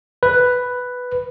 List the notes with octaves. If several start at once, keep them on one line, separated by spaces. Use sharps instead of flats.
B4